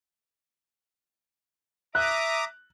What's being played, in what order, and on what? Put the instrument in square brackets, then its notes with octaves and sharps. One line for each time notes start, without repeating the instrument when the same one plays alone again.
[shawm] E5 [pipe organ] A#5 D6 D#6 [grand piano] F#6